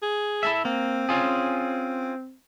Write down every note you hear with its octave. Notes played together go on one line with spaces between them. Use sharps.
G#4
E4 A4 E5
A#3 C4
C#4 F4 G#4